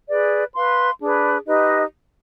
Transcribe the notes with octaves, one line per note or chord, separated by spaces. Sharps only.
G#4 B4 D5
B4 F5 C6
D4 G#4 B4
D#4 G4 B4 D#5